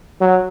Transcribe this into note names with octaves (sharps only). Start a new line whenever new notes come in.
F#3